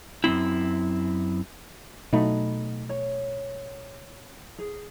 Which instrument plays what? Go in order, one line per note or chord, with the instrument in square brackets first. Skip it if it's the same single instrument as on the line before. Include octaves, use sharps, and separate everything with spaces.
[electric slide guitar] F#2 A#2 C4 E4
[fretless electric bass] B2 F#3 A3 [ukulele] D#4 F#5 B5
[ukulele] C#5
G#4